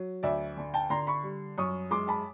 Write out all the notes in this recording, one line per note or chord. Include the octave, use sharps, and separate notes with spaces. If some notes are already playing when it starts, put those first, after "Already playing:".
Already playing: F#3
D2 D5 E5
D3
G5 A5
D3 A#5 C6
B5 C#6
G3
F#2 C#6 D#6
G#3 C6 D6
A5 B5